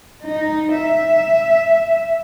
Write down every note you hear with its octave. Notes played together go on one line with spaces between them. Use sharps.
D#4
E5